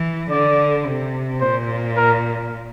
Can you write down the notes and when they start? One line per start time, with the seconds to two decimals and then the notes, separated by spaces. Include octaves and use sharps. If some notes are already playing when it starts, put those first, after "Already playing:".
Already playing: E3
0.31 D3 D5
0.86 C3
1.41 A#2 C5
1.97 A#4